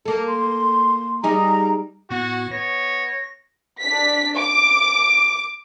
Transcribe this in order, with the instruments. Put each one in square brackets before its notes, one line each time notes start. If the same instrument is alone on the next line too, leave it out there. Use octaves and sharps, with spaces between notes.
[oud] A#3 A4
[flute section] C6
[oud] G3 D#4 G#4 [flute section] A#5
[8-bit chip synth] A2 B3 [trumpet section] F#4
[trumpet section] B3 C#5 [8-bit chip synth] A#6
[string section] D4 B6
D6